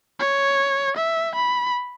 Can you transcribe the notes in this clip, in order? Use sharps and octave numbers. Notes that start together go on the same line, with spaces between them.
C#5
E5
B5